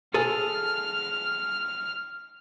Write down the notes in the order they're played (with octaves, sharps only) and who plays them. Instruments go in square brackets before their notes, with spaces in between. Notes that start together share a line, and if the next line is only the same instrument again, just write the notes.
[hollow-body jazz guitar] G#4 A4 [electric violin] F6